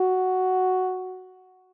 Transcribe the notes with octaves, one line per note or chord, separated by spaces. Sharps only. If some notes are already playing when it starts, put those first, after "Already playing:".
Already playing: F#4